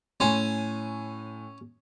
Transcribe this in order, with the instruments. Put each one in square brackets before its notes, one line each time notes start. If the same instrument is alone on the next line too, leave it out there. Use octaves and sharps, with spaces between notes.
[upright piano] A2 G#5 C6 [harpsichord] C#4